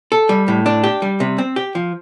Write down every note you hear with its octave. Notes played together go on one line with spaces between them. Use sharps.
A4
G3
A2
D4
G4
G3
C3
C4
G4
F3